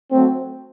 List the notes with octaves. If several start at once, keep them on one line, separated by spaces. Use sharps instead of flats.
F#3 A3 C4